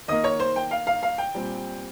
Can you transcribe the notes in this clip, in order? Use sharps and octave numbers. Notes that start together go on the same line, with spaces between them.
D#3 A#3 D#5 D#6
C#5 C#6
C5 C6
G5
F5
F5
F5
G5
A#2 G3 C4